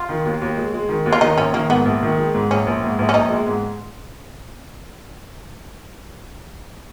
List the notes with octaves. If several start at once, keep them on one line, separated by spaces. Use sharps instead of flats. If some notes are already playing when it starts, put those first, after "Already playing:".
Already playing: F4
D#3
D#2
D#2
G#3
G#3
D#3
D#2
F4
D#3 D#4
A#1 C#4
D#3 A#3
G#2 B3
A#1
D#3
G#3
G#2
A#1 C#4
A#1
G#2
A#1
C#4
A#1 D#4
G#3
G#2